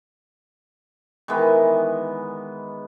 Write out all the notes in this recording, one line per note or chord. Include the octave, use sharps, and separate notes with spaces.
D#3 E3 G#3 B3